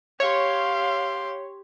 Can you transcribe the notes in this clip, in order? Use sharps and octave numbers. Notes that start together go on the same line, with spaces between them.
G4 C#5 F5 C6